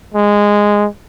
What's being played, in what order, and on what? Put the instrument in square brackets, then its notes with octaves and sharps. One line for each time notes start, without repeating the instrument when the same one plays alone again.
[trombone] G#3